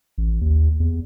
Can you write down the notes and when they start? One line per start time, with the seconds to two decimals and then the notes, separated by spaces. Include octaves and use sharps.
0.18 A1
0.41 D#2
0.80 E2